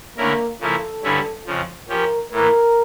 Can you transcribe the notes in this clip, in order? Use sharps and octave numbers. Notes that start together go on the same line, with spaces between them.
D3 A3 A#3 C#4 E4 A#4
C#3 F3 A#3 E4 A4
G2 D3 G3 C#4 E4
F2 C#3 F3
F3 C#4 G4 A#4
A2 E3 A#3 A#4